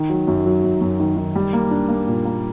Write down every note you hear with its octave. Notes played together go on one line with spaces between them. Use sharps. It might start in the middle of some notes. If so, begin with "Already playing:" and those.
Already playing: D#3
F#3
F#2
F#3
F#2
F#2
D#3
D#3
G3
A#3
D4
A#3
A#2
A#3